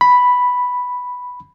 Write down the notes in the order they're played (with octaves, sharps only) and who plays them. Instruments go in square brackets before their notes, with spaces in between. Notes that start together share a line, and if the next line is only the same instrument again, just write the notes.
[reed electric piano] B5